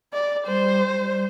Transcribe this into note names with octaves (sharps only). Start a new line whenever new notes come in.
D5
G3 C5
G3